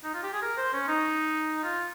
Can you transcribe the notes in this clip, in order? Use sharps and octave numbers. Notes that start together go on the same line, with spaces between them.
D#4
F4
G4
G#4
A#4
C5
C#4
D#4
F4